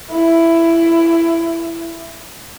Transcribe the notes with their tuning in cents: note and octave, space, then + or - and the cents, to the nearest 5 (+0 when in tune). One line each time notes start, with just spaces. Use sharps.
E4 +15